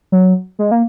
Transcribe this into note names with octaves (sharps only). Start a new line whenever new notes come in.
F#3
G#3
A#3